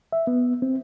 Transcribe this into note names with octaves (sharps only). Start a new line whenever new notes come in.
E5
B3
C4